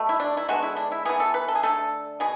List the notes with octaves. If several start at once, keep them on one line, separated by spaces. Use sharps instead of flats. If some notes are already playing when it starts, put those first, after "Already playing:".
Already playing: B2 A3
E4
D4
E4
D3 G#3 B3 F#4
E4
D4
E4
E3 B3 G#4
A4
B4
A4
G#4
D3 A3 A4
B2 G#4